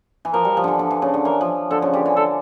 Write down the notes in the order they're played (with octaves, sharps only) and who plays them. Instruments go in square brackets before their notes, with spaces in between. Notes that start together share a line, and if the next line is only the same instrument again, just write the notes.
[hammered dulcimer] E3
[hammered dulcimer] F3 [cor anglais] A#4
[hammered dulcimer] G3
F3
D3 E3
D3
E3
C#3
D3
[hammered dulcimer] E3 [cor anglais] A#4
[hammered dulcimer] F3
[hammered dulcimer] D3 [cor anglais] A4
[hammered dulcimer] C#3
[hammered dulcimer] D3 [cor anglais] G4
[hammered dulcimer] E3
[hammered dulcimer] D3 [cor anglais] A4